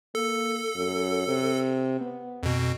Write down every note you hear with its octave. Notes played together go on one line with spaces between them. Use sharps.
A#3 A4
F#2
C3
B3
F2 B2